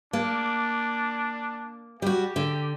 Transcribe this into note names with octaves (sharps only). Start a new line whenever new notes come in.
A#3 D4
G3 F#4 G4
D3